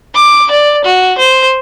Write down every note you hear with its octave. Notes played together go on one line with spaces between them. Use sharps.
D6
D5
F#4
C5